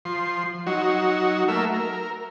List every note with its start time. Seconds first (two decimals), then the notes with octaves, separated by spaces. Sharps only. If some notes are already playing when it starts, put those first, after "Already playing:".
0.05 F3 C6
0.67 F#3 D#4 F#4
1.48 A3 A#3 A#4 E5 E6
1.74 A#4